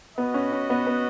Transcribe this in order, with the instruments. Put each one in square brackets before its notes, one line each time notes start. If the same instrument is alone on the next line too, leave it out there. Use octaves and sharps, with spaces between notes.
[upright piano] B3 [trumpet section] F#4 B4 D#5
[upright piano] C#4
C#4
B3
B3